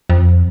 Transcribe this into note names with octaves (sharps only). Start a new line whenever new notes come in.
F2